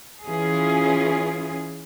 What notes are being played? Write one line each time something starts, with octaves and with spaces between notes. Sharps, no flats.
E3 C#4 F4 G#4